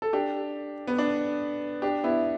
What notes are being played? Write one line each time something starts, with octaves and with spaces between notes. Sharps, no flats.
A4
D4 G4
B3
D4
D4 G4
B3 E4